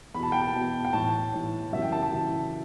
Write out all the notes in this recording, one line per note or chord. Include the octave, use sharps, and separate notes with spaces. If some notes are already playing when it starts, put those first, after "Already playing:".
E2 B2 A5 B5
G5
A5
E2 B2
G5
A2 E3 A5
A2 E3
F#2 C#3 E3 E5
G5
A5
A5
F#2 C#3 E3